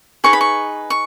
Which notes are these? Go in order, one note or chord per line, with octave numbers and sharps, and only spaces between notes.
D#4 G#4 B4 C#6
B5
C#6
C#6